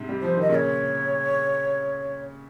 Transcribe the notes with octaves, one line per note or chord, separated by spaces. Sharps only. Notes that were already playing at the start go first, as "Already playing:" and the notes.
Already playing: G#2 C3
G3
F3 C5
D#3 D#5
A#2 C#3 D#5
C#5